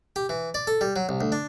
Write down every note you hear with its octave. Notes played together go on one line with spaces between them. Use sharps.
G4
E3
D5
A4
G3
F#3
C2
D2
D4